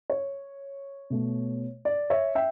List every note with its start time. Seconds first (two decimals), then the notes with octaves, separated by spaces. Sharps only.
0.10 C#5
1.10 B2 A3
1.85 D5
2.10 C#5 E5
2.35 E5 G5